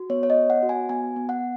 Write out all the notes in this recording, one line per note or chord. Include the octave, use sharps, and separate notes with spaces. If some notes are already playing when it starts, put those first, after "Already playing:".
Already playing: F#4
B3 C#5
C#5
D#5
B3
F#5
F#4
G#5
B3 G#5
B3
F#5